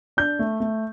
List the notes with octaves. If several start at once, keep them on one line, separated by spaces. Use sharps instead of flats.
D4 G6
A3
A3